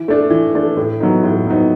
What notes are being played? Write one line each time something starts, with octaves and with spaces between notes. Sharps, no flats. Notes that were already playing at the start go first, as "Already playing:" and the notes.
Already playing: E3
A3 D4
E3
A3 D4
A2
F#3 B3 D#4
A2
F#3 B3 D#4